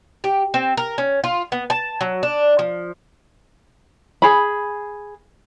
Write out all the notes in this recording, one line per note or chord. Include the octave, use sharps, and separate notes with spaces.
G4
C4
A#4
C#4
F4
B3
A5
F#3
D4
F3
G#4 B5